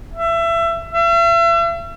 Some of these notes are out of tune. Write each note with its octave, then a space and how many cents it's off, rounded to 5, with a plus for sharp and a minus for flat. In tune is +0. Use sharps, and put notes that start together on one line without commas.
E5 +25
E5 +40